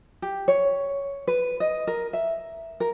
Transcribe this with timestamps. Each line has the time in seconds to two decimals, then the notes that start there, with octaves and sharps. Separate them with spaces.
0.22 G4
0.48 C#5
1.27 B4
1.60 D#5
1.87 A#4
2.13 E5
2.80 A#4